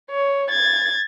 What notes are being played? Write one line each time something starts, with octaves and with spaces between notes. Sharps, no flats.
C#5
G#6 A6